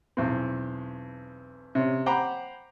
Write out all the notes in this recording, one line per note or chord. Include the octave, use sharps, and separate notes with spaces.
B1 E2 C4
C3 C#4
C5 F#5 G5 A#5 B5 D6